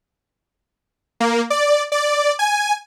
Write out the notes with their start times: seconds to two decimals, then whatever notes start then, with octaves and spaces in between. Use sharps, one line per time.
1.20 A#3
1.50 D5
1.92 D5
2.39 G#5